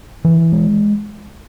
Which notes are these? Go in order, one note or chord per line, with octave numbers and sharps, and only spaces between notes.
E3
G#3